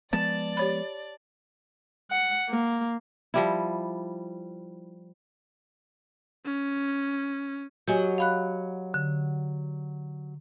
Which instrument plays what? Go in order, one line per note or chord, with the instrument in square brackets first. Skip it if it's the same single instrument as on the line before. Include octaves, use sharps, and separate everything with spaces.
[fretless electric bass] F3 G#3 B3 [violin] D5 [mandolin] A5
[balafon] G4 C#5 B5
[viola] F#5
A#3
[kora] F3 G3 E4
[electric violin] C#4
[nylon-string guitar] F#3 F#4 D#5 [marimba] G4 G#5
[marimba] F5 B5 F#6
D3